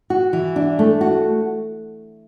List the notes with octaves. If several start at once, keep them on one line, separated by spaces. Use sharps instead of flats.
F#4
E3
D4
A3
F#4